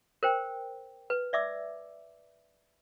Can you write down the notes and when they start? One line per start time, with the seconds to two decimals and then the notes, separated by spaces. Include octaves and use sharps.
0.23 A#4 C5 G5
1.10 B4
1.33 D5 E5 D6 E6